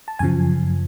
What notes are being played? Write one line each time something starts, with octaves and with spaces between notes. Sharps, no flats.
A5
F#2 C#3 F3 G#5